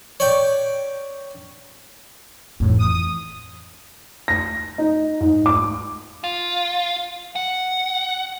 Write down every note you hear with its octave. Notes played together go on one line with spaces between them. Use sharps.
C#5 D5 G5
F2 A2 E3
D#6
A#6
D#4
G#2
D6
F4
F#5